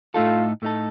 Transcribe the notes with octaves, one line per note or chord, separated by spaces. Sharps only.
A2 A3 D#4 F4 A4
A2 A3 D#4 A4